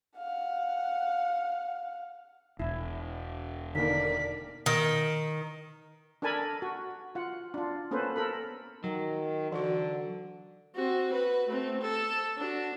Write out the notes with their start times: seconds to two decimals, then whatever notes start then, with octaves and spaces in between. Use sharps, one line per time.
0.18 F5 F#5
2.59 E1 E4
3.75 D3 D#3 A#3 A#4 D5 B6
4.66 D#3
6.22 D4 A4 A#4 G#5 A5 B5
6.62 F#4
7.15 F4 F#5
7.54 D4 F4
7.91 A#3 B3 C#4 A4 B4 C5
8.16 A4 A#4 B5
8.84 D#3 F#3 F#5
9.52 D3 E3 F#4
10.75 C4 F#4
11.12 F#4 B4
11.47 A3 C4
11.81 A4
12.37 D4 F#4